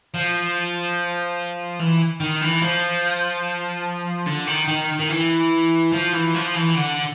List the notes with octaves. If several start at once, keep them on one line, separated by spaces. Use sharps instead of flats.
F3
E3
D#3
E3
F3
D3
D#3
D#3
D#3
E3
F3
E3
F3
E3
D3